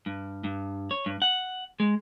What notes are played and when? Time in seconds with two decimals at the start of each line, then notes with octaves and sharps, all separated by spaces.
0.06 G2
0.44 G2
0.91 C#5
1.06 G2
1.22 F#5
1.80 G#3